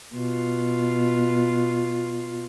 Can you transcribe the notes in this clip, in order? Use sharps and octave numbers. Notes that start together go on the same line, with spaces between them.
B2 F4